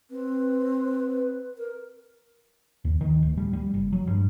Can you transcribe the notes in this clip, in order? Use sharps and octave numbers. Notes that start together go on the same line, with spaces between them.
C4 B4
A#4
D#2
D#3
D1
G3
G3
F#1
F#3
G2